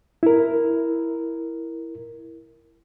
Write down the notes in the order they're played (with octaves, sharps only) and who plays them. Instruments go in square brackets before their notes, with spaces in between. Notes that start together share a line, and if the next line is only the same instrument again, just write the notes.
[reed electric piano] E4 A#4